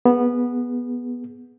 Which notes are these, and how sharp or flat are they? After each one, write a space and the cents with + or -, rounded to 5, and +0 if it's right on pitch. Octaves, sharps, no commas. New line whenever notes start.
B3 -10 G#4 +0